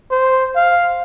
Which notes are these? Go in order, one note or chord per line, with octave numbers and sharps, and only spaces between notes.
C5
F5